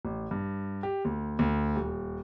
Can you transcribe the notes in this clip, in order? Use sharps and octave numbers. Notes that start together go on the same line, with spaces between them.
A1
G2
G4
D2
D2
D#1